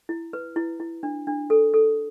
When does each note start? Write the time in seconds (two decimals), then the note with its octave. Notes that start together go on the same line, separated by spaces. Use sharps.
0.09 E4
0.33 B4
0.56 E4
0.80 E4
1.03 D4
1.27 D4
1.50 A4
1.74 A4